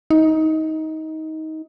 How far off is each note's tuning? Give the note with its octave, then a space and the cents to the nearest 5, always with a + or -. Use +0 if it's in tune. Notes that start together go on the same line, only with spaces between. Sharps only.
D#4 +20